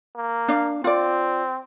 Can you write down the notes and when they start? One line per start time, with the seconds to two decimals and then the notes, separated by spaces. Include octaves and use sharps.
0.16 A#3
0.48 D4 F5
0.84 C4 F4 D5